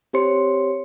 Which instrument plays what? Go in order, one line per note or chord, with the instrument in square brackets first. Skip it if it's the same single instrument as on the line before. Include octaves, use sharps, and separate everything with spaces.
[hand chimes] C4 G4 C5 C#5 C6 C#7